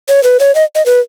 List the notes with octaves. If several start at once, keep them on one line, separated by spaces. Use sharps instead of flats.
C#5
B4
C#5
D#5
D#5
B4